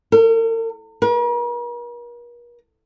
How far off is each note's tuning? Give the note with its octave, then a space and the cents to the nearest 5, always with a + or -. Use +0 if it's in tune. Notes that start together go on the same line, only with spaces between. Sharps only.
A#4 -45
A#4 +45